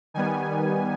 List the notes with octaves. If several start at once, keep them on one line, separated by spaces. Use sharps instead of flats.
D#3 G3 B3 G#5